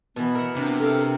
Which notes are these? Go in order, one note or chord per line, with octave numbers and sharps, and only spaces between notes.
B2 E3 B3
A#4 E5 F#5
C3 D4
A4 A#4 F5